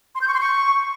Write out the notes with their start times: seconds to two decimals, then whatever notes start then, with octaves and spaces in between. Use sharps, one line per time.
0.15 C6
0.21 G6
0.28 C#6
0.34 C6
0.40 C#6